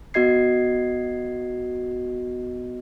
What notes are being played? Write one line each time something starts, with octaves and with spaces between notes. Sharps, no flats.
B3 F#4 D#5 G#6 C7